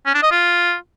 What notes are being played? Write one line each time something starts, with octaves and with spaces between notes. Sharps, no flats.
C#4
D4
D#5
F4